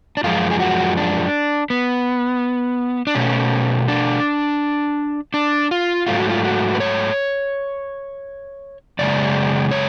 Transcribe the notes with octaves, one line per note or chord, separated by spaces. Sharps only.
D4
F#2 F3 G#3 F4
G#4
F#4
D4
B3
D4
B2 A3 C#4
D4
D4
F4
G#2 F#3 A3 F4
F#4
F4
F#4
B4
C#5
F#2 C#3 G#3 D5
C#5